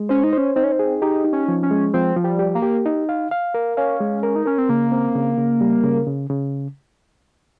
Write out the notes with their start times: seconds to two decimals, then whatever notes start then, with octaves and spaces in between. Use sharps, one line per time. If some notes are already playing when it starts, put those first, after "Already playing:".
Already playing: G#3
0.09 C#4 C5
0.24 D#4
0.33 C#4 C5
0.56 C4 D#4
0.64 C#4
0.72 C4
0.79 G#4
1.02 D#4 G4
1.25 D#4
1.33 C#4
1.48 F3
1.63 C#4
1.71 G#3
1.94 F3 C4
2.16 F3
2.24 G3
2.39 G4
2.55 A#3
2.62 G4
2.86 D#4
3.09 F5
3.31 F5
3.54 A#4
3.77 C#4 F5
4.00 G#3
4.23 A#4
4.36 D#4
4.46 C#4 A#4
4.58 C4
4.69 C#3 A#3
4.92 C4
5.16 C#3
5.37 C#3
5.61 G3
5.84 C#3
6.07 C#3
6.30 C#3